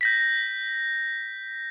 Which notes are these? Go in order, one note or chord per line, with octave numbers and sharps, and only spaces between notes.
G6 A#6 B6